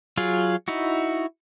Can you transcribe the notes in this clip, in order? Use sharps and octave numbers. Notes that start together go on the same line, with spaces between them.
F#3 F4 G#4
D#4 E4 F#4